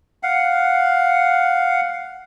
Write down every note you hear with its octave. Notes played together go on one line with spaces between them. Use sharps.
F5 F#5